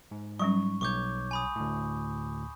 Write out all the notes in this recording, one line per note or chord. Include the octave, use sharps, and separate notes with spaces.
G#2
F#3 G3 C#4 C#6
B1 C#5 C#6 D6 G6
G#5 B5 D#6
D2 A2